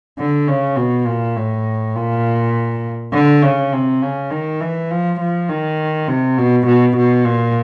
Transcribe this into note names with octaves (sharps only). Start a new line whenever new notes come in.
D3
C#3
B2
A#2
A2
A#2
D3
C#3
C3
C#3
D#3
E3
F3
F3
D#3
C3
B2
B2
B2
A#2